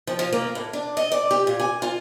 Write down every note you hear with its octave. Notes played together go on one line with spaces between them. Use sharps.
F3
F3
A#3
A2
D4
D#5
D5
G4
A#2
G#5
F4